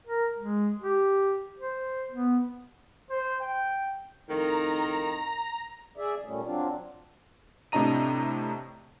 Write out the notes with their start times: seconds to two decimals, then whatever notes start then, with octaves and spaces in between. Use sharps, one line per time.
0.07 A#4
0.39 G#3
0.82 G4
1.59 C5
2.11 B3
3.10 C5
3.41 G5
4.29 F2 A2 D#3 A#5
5.97 G#4 D5 E5
6.25 A#2 G3 A3 C#4
6.44 F#3 C4 D4 F4
7.72 A2 C3 D4 D#5 A#5 D#7